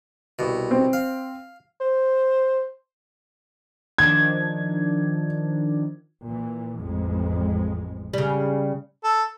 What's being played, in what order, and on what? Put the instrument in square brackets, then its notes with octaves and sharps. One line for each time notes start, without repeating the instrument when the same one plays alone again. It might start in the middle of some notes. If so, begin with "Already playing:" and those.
[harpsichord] C2 B2
[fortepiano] C4
[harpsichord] F5
[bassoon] C5
[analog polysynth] D#3 F3 D4 [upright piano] G#6
[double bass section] A#2 E3
A1 F2 G#3
[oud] C#3 G3
[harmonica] A4